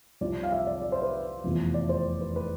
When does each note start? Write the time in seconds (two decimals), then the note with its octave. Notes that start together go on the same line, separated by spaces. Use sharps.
0.21 C2 C3 F3 C4 D5
0.43 F5
0.52 E5
0.67 D5
0.82 D5
0.92 C5
1.02 B4
1.44 F1 E2 C3 F3
1.74 D5
1.89 C5
2.21 B4
2.36 B4